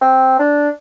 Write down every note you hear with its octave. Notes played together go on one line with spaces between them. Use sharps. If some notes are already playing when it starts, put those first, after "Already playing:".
C4
D4